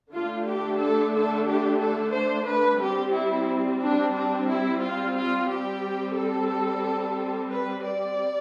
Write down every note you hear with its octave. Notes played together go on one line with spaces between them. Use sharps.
D3 A3 D4 F4
G4
A4
A4
G4
A4
C5
B4
G3 C4 G4
E4
D4
D4
E4
F4
F4
G3 C4 G4
A4
B4
D5